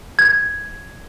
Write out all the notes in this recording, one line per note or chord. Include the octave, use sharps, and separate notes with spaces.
G#6